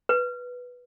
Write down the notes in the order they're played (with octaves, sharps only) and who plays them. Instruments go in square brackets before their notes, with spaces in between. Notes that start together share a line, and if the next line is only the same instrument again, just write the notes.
[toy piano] B4